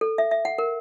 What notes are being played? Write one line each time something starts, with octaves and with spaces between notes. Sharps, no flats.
A4
E5
E5
F#5
A#4